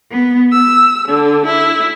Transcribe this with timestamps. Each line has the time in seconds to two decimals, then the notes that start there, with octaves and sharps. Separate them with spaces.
0.12 B3
0.52 E6
1.08 D3
1.46 E4